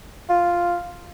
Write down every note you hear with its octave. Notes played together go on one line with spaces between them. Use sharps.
F4